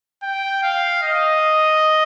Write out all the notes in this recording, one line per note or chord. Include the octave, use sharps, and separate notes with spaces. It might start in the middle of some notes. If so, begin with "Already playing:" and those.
G5
F5
D#5